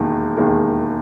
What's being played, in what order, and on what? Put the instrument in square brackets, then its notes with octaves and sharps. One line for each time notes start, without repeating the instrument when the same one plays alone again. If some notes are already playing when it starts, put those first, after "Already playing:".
Already playing: [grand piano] E1 D#2 D#3 G#3
E1 D#2 D#3 G#3